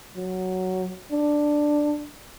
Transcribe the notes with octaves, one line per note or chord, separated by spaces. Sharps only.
F#3
D4